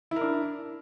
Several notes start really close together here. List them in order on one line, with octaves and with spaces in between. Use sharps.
E4 A#4 D4